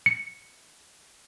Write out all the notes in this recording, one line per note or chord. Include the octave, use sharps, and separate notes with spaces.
C#7